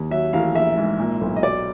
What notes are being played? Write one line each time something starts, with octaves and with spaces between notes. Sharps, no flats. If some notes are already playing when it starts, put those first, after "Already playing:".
Already playing: D#2
F#3 E5
A1 F5
A#1 E5
G#2
A#2
B1
D#5
F#3 D5